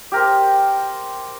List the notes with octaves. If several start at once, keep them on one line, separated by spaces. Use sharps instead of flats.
G4 A#4 C5